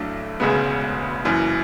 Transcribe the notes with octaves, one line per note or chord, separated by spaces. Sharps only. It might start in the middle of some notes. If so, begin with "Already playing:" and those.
Already playing: B1 A2 F#3 A3 D4
E1 D2 C#3 G#3 B3
F#1 F#2 E3